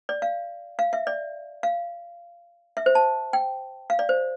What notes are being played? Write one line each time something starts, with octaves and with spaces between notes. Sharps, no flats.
D5
F5
F5
E5
D5
F5
E5
C5
A5
G5
F5
D5
C5